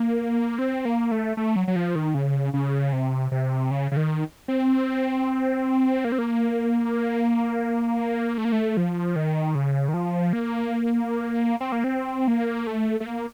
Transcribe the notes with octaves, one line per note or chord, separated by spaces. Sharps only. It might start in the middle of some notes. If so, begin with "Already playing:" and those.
Already playing: A#3
C4
A#3
A3
A3
F#3
F#3
F3
D#3
C#3
C#3
C3
C3
C#3
C#3
D#3
C4
A#3
C4
A#3
A3
A#3
A3
F3
D#3
C#3
D#3
F3
A#3
C4
A#3
C4
A#3
A3
A3
A#3